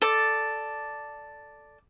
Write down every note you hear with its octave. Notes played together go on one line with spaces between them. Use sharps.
A4 D5